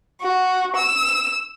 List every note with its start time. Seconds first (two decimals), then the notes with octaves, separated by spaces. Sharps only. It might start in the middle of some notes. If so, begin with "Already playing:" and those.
0.22 F#4
0.77 E6